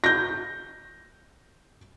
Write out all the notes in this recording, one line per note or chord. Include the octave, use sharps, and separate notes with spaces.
G6 A#6